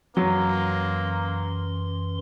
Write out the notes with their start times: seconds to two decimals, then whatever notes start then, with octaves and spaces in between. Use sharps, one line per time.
0.17 F#2 E3 F#3 A#3 C6